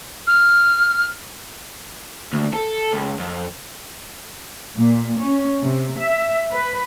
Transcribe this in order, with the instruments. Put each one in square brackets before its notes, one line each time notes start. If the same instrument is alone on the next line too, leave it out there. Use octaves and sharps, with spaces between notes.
[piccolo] F6
[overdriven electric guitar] D2
A4
C#2
F2
[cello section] A#2
C#4
C3
E5
B4